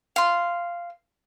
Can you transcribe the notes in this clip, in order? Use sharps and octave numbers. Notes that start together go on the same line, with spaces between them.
F5 C6